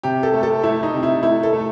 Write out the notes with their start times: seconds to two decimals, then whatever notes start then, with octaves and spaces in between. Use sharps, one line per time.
0.03 C3 G4
0.23 A4
0.34 A3
0.43 A4
0.63 A3 E4
0.83 D#4
0.94 C3
1.03 E4
1.23 A3 E4
1.43 A4
1.53 A3